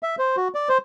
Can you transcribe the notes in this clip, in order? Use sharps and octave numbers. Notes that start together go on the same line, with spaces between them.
E5
C5
F#4
D5
C5